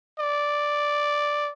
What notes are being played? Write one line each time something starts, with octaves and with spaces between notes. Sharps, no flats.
D5